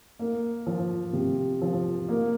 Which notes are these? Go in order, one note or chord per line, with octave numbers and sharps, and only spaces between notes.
A#3
F3
C3
F3
A#3